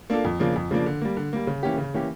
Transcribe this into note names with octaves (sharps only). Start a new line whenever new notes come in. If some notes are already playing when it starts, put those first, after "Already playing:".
A#3 D4 F4 A4
F2
C#3 F3 A#3 D4
F2
C#3 F3 A#3 D4
D3
G3 A#3
D3
G3 A#3
C#3
E3 A#3 C#4 G4
C#3
E3 A#3 C#4 G4